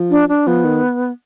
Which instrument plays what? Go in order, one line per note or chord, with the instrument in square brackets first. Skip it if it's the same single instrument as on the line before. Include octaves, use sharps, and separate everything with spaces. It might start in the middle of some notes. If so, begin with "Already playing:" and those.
Already playing: [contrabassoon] F3
[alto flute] D4
D4
[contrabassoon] F3 [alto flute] B3
[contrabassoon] D#3